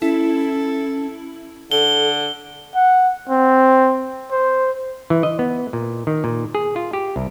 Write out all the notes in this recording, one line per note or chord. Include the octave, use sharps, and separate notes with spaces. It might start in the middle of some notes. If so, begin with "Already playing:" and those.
C#4 E4 A4
D3 A4 G7
F#5
C4
C5
E3
D#5
B3
A#2
D#3
A#2
G#4
F4
G4
C2